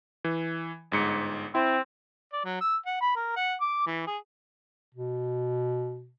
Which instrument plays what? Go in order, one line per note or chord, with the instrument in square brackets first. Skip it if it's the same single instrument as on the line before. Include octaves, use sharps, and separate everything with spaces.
[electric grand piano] E3
G1 G#2 C#7
[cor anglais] C4 [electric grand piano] E4
[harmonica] D5
F#3
E6
F#5
B5
A#4
F#5
D6
E3
G#4
[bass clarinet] B2